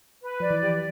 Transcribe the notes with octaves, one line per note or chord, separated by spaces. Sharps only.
B4
F3 D5
E3
G4